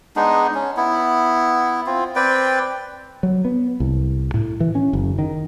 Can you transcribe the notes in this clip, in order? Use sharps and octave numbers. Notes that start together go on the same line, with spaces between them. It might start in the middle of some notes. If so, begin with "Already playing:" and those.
G#3 B3 D4 D#4
C#4
B3 E4
C4 F4
C4 B4 D5 G5
F#3
B3
C2
A2
E3
C#4
F#1
D#3